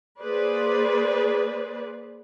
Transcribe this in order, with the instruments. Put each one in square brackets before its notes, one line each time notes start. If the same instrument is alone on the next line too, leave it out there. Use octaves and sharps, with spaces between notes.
[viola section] A#3 G#4 B4 C5 D5